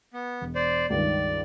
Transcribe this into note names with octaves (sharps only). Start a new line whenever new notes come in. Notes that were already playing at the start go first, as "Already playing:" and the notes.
B3
E1
C5 D5
C#2 G2 D#3 D5